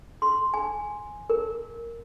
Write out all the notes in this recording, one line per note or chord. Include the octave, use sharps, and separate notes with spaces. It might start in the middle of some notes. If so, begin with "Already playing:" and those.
C6
G#5
A#4